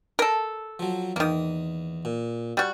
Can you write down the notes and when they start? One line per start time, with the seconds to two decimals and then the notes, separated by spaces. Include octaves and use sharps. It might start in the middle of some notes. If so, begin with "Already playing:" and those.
0.19 A4 A#4
0.79 F3 F#3
1.16 E2 D#3 A#3 D#6
2.05 A#2
2.57 G3 F#4